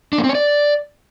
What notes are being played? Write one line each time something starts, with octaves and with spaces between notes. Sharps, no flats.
D4
A#3
C4
C#5
D5